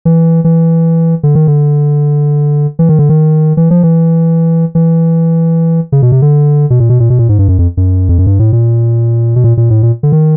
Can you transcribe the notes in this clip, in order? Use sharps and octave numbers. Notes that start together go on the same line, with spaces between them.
E3
E3
D3
D#3
D3
E3
D#3
D3
D#3
E3
F3
E3
E3
C#3
B2
C3
D3
B2
A#2
B2
A#2
B2
A#2
G#2
G2
F#2
F2
F#2
F2
F#2
G2
A2
A#2
B2
A#2
A#2
A2
A#2
D3
D#3